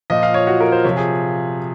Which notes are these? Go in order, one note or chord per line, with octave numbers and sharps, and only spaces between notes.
A#2 F3 D#5
F5
C#5
F#4
A#4
C5
C3 F3 C#5
G#4